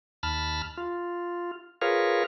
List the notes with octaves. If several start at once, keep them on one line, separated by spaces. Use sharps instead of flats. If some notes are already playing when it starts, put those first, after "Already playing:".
D#2 A5 B5 F6
F4
F4 G#4 A#4 B4 C#5 F5